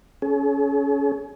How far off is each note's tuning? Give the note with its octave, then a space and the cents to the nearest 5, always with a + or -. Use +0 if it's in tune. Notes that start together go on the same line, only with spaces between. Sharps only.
C#4 +15 G#4 +40